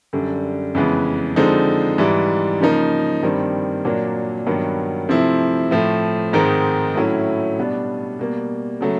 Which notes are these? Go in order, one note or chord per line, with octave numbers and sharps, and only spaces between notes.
F#2 D3 G3
F2 C#3 E3 G#3 B3
D3 F3 G#3 C4 D#4
G#2 E3 G3
C#3 F3 A#3 D#4
G2 D#3 G3 C4
A#2 F#3 A#3 D4
G2 D#3 F#3 B3
C3 F3 A3 C4 E4
A2 F3 A3
G#2 D#3 G#3 C4 D#4
A2 F#3 A3 C#4 E4
B2 G3 B3 D4
B2 G3 A#3
C#3 F#3 A3